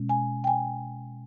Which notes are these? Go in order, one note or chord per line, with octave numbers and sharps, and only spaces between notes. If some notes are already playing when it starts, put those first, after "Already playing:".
Already playing: B2 G#3 C#4
G#5
G5
G#5